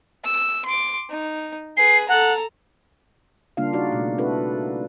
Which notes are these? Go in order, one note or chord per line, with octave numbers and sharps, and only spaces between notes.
E6
C6 D6
D#4
G#4 B4 C7
A4 F#5 A#5
C#3 G3 A#3 D4 F4 F5
D#4 F#4 D5
B2 A3
C4 D4 E4 F#4 A4 B4